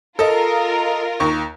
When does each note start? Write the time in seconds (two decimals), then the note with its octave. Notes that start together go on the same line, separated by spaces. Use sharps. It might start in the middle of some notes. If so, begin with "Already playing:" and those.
0.19 F4 A4 A#4 D#5
1.20 D#2 C#6